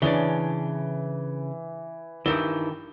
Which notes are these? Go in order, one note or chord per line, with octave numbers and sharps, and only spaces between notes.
C#3 E3 C#4 D4 G7
G2 D#3 E3 G7